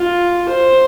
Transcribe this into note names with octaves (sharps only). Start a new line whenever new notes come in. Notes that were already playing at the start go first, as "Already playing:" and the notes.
Already playing: F4
C5